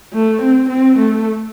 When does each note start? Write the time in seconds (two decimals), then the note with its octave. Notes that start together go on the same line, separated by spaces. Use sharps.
0.14 A3
0.41 C4
0.69 C4
0.98 A3